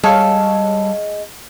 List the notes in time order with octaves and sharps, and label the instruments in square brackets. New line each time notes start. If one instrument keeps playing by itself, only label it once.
[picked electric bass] G3 [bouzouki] G#3 [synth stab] G#4 C#5 F5 [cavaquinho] A4